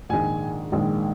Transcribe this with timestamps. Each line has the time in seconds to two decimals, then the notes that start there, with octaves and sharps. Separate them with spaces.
0.09 A#1 G#2 D#3 G#3 G#5
0.72 A#1 G#2 D#3 G#3